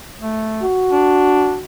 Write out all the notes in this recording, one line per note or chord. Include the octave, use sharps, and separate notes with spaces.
A3
F#4
D4